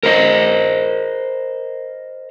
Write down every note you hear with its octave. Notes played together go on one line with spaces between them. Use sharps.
A#4 C5 D#5